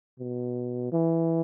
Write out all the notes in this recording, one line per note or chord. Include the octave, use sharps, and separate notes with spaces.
B2
E3